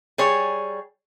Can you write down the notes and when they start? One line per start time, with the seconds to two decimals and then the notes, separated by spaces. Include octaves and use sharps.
0.18 G3 G#4 C#5